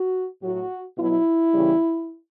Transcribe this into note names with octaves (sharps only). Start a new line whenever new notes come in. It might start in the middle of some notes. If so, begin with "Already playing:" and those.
Already playing: F#4
A2 F#3 F#4
B2 F#3 E4
E2 C#3 E3 G3